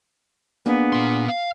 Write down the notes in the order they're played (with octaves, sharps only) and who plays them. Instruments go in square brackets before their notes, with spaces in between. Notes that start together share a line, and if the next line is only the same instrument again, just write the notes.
[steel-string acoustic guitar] A#3 D4 G#4 [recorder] B3
[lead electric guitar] A#2 C6
F5